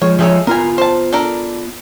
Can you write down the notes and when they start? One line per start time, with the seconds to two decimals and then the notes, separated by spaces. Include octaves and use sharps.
0.02 F3 G#3 C#5
0.19 F3 G#3 A3 G#4 C#5 E5
0.47 B3 F4 A#4 G#5 A#5
0.78 C5 A5
1.13 D4 A4 A#4